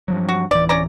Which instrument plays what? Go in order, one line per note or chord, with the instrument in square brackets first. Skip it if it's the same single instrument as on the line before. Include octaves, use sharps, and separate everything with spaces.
[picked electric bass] G2 F3 F#3
[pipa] F#4
[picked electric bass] D1 E3 [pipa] D5
[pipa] C#4 D5 A#5